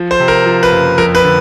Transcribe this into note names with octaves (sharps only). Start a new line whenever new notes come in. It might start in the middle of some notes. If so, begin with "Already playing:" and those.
Already playing: F3
C5
C3
A#4
F3
B4
F#1
F2 A#4
B4
D3